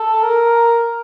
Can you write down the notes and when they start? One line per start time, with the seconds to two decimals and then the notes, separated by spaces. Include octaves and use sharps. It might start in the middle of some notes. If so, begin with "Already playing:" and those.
Already playing: A4
0.22 A#4